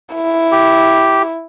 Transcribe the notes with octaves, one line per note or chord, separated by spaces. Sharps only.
E4
G4